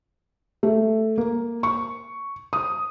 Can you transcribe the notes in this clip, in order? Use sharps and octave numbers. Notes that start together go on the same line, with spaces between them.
A3
A#3
C#6
D#6